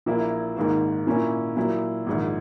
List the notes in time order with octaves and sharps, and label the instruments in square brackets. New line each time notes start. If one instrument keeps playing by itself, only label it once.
[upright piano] A#1 A#2 A#3 E4
G#1 G#2 D#3 A#3
A#2 A#3 C#4 E4
A#2 F#3 A#3 E4
A#1 G#2 D#3